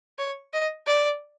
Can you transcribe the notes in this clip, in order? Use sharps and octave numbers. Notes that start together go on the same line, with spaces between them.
C#5
D#5
D5